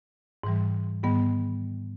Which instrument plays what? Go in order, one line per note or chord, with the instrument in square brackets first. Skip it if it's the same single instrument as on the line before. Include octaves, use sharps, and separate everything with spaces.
[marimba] G#2 E3 G3
G#2 D#3 G3 B3